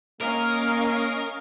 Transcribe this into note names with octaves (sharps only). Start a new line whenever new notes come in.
A#3 C#4 A#4 D#5 F5